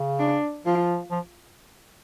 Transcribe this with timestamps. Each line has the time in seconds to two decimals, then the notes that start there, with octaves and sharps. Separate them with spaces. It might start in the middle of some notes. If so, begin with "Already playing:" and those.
Already playing: C#3
0.19 D4
0.66 F3 F4
1.11 F3